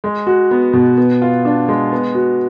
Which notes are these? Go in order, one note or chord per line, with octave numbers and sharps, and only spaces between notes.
G#3
F#4
B3
B2
B3
F4
D4
G#3
B3
F#4